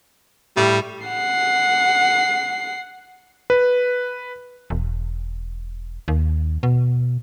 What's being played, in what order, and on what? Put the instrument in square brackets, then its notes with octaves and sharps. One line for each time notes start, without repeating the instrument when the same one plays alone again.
[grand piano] A2 [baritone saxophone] G3
[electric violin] F#5 C7
[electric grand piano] B4
[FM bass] E1
D#2
B2